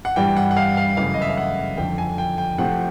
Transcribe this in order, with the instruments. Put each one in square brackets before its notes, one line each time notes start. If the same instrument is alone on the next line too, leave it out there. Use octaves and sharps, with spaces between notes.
[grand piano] F#5
G2 E3 G3 G5
F#5
F#5
F5
F5
F#2 C#3 E3 A3 F5
D#5
E5
F5
F#5
F2 D3 F3 G5
G#5
G5
G5
C3 F3 A3 C4 F#5